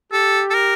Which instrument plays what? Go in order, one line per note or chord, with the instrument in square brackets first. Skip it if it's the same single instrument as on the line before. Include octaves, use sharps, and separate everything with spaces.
[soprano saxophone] G4 [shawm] A4
[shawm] A4
A#4